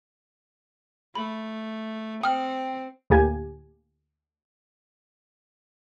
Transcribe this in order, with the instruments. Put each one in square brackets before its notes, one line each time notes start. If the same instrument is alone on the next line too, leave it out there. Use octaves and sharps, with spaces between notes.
[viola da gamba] A3 [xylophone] B5
[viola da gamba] C4 [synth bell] G5 [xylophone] D#6 F6
[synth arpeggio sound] D2 A2 A#3 G4 G#5 G#6